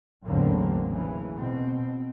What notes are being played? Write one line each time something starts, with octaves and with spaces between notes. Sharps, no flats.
A1 E2 D3 F#3 A#3 C4
C#3 E3
B2 C4